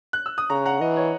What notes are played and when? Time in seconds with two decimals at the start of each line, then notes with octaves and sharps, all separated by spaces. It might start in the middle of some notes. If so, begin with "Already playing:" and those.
0.13 F#6
0.26 E6
0.38 D#6
0.50 C#3 A#5 C#6
0.65 F#5 A#5
0.81 E3 D#5
0.97 C#5